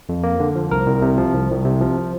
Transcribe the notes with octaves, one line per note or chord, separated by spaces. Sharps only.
F2
A#3
D3
F3
C2 A#4
C2
C3
F3
C2
C2
C3
F3